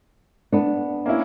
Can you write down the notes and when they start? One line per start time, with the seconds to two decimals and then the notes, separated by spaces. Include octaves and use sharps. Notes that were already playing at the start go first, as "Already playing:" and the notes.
0.52 B3 D4
1.06 A#3 C#4 E4